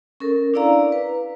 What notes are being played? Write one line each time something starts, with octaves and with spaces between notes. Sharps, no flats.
C#4 A4 A#4
D4 E4 D5 F5 A#5
B4